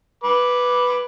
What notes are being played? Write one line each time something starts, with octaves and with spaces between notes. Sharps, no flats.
B4 D6